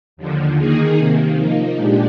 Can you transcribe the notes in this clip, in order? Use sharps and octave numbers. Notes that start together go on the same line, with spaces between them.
D#2 D3 F3
D#3 A#3 D#4 G#4
C3 D#3 A#3
F3 A#3 D#4
A#2 G#3 D4 G4